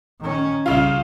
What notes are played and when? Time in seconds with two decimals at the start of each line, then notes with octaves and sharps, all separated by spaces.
0.21 D#3 C#4
0.66 C2 C#3 F4